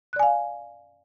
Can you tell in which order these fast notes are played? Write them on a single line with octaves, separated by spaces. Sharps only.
F#6 D5 G#5 F5